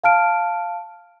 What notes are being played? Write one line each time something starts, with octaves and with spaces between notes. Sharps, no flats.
F5 A5 F6 D7